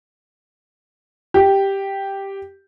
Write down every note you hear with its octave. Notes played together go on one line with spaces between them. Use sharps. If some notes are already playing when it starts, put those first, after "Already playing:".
G4